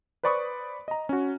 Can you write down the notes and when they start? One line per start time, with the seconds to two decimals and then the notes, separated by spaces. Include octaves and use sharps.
0.23 B4 C5 D5 B5 C#6 D#6
0.88 D#5 A#5
1.09 C#4 F#4